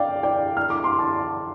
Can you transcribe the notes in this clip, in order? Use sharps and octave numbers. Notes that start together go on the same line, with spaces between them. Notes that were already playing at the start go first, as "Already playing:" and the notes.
Already playing: D5 F5 G5
D5 G5
F6
D6
C6
A5 D6